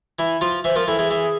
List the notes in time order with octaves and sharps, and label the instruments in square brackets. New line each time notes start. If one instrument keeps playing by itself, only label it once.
[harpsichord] E3 E4
F3 F4
[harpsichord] E3 E4 [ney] C5
[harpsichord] F3 F4 [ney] A#4
[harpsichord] E3 E4 [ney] A4
[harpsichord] E3 E4 [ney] G#4
[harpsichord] E3 E4